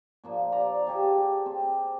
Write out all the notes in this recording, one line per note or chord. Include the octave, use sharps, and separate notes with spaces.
A#2 F3 A#3
D5 A#5 D6
G4 G#4 A5
C5
C4